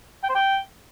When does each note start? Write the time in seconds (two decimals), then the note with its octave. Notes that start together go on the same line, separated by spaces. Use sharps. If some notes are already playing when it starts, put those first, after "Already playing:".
0.23 G5
0.29 C5
0.35 G5